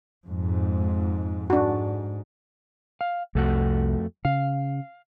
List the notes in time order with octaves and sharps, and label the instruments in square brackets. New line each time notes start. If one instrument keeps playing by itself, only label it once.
[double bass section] F2 G#2
[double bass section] G#2 [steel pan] D4 F#4
[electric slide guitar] F5
[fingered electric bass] C2 [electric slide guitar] F2 A3 F#4
[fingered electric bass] C#3 [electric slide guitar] F5